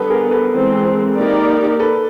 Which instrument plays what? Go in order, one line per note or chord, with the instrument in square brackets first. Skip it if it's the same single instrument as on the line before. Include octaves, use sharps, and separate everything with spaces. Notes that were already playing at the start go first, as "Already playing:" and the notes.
Already playing: [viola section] D3 G3 B3 [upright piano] A4 B4
[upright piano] G#4 A#4
A4 B4
[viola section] E3 G#3 C4
A#3 D#4 G4 A#4 D5
[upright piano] A4 B4